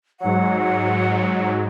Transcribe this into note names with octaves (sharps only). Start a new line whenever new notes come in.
G#2 F#3 F#5